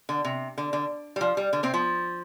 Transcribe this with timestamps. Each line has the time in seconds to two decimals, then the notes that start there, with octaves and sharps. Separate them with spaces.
0.09 D3
0.25 C3
0.58 D3
0.73 D3
1.16 G3
1.21 F3
1.37 G3
1.53 D3
1.63 C3 C4
1.74 F3